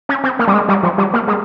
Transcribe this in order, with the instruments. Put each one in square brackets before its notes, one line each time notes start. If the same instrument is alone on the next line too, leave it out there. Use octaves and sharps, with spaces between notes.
[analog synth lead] C#4
C4
A#3
G3
G#3
G3
F3
G3
A#3
G#3